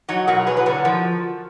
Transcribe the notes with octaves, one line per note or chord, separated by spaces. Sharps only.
F#3 D#4 F#4
B2 F#4 A#4
F#3 G#4 B4
B4
D3 F#4 A#4
F3